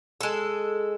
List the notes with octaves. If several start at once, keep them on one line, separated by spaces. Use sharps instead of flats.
G#3 A4